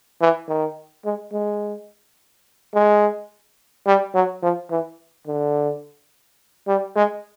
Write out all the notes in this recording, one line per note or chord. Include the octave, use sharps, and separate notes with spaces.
E3
D#3
G#3
G#3
G#3
G3
F#3
F3
E3
D3
G3
G#3